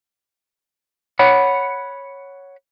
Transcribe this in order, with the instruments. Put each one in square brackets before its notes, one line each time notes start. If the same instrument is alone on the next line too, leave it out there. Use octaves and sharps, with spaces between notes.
[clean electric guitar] C#5 F#5 B5